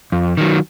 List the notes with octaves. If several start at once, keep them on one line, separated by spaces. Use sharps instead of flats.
F2
D#3 F#3